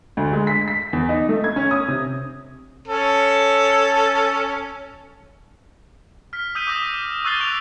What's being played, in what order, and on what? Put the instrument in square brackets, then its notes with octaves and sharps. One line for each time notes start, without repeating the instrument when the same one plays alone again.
[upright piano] D2
G#3
B6
B6
E2
D#4
A3
G#6
C#4
D#6
C3
[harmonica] C#4 A4
[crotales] F6 B6
D#6 E6 G6 B6 D#7
D6 D#6 A#6
C#6 E6 F#6 A6 C7 G7
D6 E6 F#6 D7 F7